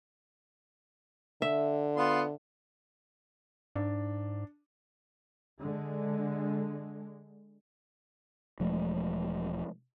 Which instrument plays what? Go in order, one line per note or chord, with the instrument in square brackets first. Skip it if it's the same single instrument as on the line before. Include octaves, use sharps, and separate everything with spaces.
[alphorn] D3 [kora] E5
[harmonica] B3 F4 C6
[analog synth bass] G#2 [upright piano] D4
[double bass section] D3 G#3
[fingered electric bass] E1 F3 G#3 A3